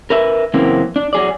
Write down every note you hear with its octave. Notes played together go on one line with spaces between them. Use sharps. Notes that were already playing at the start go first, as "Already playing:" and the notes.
A#4 B4 E5
F#2 C#3 E3 A#3 C4
D4
F#3 G#4 D5